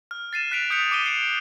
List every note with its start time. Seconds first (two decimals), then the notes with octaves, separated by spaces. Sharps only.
0.11 F6
0.33 A6 C7 D#7 E7
0.51 F#6 B6 D7 F7
0.70 D#6 G6 B6 C#7 F7
0.91 D6 C7 C#7 D#7 G7
1.06 C7 D7 G7